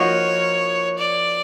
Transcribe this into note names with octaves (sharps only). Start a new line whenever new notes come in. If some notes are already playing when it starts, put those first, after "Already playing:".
Already playing: F3 A#3 D#4 F#4 C#5
D5